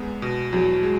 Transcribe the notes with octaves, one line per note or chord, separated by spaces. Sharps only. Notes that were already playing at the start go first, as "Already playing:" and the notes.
Already playing: E2 G#3 B3
B2
E2 F#3
G#3